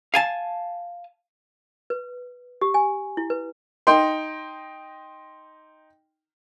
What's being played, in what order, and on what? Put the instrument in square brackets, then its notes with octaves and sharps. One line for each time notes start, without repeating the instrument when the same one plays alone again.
[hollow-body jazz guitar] F5 G#5 A5
[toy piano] B4
G4
G#5
E4
B4
[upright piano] D#4 D#5 G5 C6